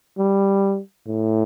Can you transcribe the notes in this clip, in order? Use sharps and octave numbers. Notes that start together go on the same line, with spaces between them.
G3
A2